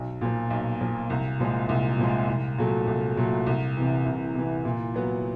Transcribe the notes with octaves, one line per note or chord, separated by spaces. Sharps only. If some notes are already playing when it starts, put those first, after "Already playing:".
Already playing: B1
A#2 F3
B1
A#2 F3
C2
A#2 F3 G#3
C2
A#2 F3 G#3
C2
A#2 F#3 A3
C2
A#2 F#3 A3
C2
C3 E3
C2
C3 E3
A#2
F#3 B3